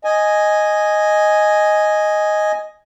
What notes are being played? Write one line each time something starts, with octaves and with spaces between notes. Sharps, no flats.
D#5 G#5